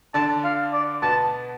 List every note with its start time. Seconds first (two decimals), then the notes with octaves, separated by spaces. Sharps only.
0.14 D3 D4 A5
0.44 F5
0.73 D5
1.02 B2 B3 A5